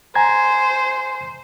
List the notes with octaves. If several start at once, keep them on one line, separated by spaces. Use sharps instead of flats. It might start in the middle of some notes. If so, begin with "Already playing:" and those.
C5 G#5 A#5 G#6